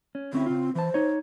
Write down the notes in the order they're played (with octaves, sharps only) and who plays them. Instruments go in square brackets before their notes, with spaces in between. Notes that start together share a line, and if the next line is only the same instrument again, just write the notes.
[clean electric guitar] C#4
[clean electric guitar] D2 C#4 E4 [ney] C4
[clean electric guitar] C#3 F4
[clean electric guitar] E3 A5 [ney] C5
[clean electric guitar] D#4 C#5